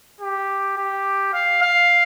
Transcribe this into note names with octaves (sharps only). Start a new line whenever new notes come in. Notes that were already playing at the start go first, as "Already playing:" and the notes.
G4
G4
F5
F5